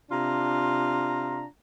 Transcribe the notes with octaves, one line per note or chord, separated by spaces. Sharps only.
C3 D4 F4 A#5